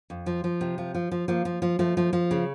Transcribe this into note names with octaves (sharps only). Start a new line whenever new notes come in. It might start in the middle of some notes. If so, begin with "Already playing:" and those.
F2
F3
F3
C3
F3
F3
F3
F3 A#3
F3
F3
F3 A3
F3
F3
C#3